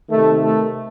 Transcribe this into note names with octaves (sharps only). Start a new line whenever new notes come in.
C3 D#3 A3
A3